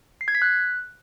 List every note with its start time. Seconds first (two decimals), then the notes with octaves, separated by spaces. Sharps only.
0.21 C7
0.28 G#6
0.35 B6
0.42 F#6